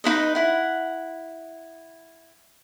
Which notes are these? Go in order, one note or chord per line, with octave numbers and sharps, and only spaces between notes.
D#4 E4 B4 D#5
E4 F#5